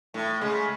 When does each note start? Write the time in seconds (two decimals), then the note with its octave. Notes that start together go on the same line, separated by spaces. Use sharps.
0.14 A2 A3
0.41 C#3 G#3